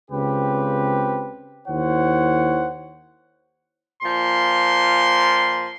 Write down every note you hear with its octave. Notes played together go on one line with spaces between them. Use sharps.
C#2 C#3 C4 G4 B4
D#2 E4 C5 C#5 F#5
A#2 F3 C6